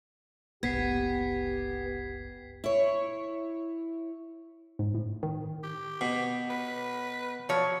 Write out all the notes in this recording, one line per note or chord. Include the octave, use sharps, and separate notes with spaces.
F#1 C2 B3 G4 G#6 B6 C7
E4 C#5
G#2
A2
D#3
G4
B2
B4
F3 F#3 C#5